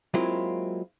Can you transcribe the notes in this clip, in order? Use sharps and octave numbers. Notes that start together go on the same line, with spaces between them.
F#3 G#3 A#3 C4 E4 F4